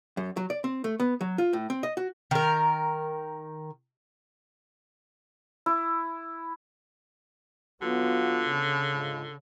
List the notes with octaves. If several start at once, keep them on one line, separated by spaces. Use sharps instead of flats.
F#2
F#3
D5
C4
A3
B3
F#3
F4
A2
C4
D#5
F#4
D#3 A#4
E4
D3 F#3 B3 F4 F#4
C#3
G#2 F4